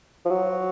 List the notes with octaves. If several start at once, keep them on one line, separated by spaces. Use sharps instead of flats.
F3
F#3